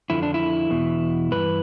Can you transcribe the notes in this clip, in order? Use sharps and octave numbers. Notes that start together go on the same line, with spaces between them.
F2 D3 F3 E4
D4
E4
E2 B2
G2 E3 B4